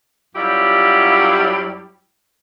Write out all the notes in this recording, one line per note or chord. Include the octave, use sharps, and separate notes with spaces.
F#2 F#3 G3 E4 F4 G4